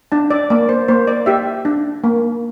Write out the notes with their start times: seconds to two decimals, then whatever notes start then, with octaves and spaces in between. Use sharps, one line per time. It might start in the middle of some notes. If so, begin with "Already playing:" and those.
0.12 D4 A5
0.30 D5
0.50 A#3 D5
0.69 C5
0.88 A#3 C5
1.07 D5
1.26 G4 E5
1.65 D4
2.04 A#3